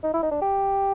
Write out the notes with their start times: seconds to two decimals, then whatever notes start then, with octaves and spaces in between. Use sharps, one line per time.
0.03 D#4
0.13 E4
0.23 D#4
0.32 D4
0.41 G4